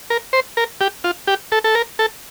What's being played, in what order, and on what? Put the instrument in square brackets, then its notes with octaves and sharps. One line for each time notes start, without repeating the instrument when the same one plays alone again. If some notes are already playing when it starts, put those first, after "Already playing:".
[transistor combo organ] A#4
C5
A#4
G4
F4
G4
A4
A4
A#4
A4